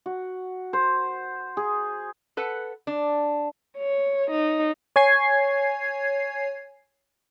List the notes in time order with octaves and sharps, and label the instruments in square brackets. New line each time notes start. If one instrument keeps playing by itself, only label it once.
[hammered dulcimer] F#4
C5
G#4
[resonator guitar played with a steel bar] A4 B4 F#5
D4
[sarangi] C#5
D#4
[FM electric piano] C#5 G#5 G#6 C7